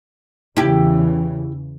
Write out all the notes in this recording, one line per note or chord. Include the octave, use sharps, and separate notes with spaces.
E2 C#3 E3 E4 G4